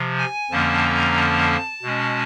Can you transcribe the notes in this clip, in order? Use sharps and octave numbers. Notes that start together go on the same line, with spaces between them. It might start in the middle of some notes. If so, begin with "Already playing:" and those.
Already playing: C3 F3
G#5
F2 D3 F3 A#3 C#4 A5
A#5
A5
B2 G#3 C#4